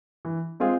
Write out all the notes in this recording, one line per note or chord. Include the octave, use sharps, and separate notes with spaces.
E3
G#3 C4 F4 G#4